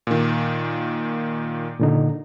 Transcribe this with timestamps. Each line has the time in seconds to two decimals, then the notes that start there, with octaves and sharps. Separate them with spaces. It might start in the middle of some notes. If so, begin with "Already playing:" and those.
0.07 A#2 D#3
1.80 A#2 D3 D#4